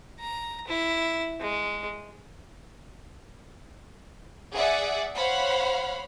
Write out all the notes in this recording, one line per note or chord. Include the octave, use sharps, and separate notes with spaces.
A#5
E4
G#3
G#4 D5 E5 F#5
C5 C#5 F5 F#5 B5